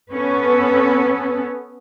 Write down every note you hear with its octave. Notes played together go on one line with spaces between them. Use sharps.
B3 C#4 A4 B4